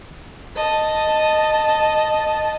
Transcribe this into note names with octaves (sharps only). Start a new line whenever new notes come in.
D#5 A5